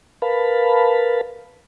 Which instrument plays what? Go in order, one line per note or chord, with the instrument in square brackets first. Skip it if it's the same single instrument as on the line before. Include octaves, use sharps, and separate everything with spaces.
[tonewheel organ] A#4 B4 F5 A5 B5